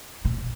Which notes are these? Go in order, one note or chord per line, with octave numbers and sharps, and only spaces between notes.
A#2